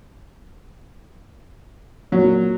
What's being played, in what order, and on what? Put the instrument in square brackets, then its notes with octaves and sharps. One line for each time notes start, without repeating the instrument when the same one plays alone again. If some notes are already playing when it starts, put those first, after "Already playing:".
[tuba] A#2 [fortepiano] F#3